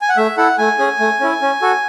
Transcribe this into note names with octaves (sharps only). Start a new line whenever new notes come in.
G#5
F#5
A3 E5
E4 A4 F#5
A3 G#5
C#4 G#4
A3
C#4 E4
C#4
F#4 A4